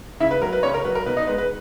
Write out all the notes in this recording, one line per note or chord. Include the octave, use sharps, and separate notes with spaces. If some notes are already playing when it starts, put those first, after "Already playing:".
C#3 E4 E5
B4
F#3 A#4
B4
C#3 C#4 C#5
A#4
F#3 B4
A#4
B2 B4
D#4 D#5
G#3 B4
B4